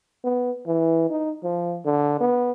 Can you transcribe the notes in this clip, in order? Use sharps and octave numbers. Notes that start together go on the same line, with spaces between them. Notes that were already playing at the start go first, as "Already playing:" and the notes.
B3
E3
D#4
F3
D3
B3